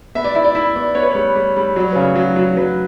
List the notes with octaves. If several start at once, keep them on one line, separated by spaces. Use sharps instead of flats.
B3 E5
D5
E4 E5
D5
E4 E5
B3 D5
B3 C#5
B4
G3 C#5
G3
G3
F#3 D5
C#5
B4
C#3 C#5
F#3
F#3
F#3 B4